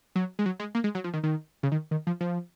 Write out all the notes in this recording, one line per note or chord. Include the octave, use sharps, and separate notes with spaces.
F#3
G#3
F#3
G#3
A#3
G#3
F#3
F3
D#3
D#3
C#3
D#3
D#3
F3
F3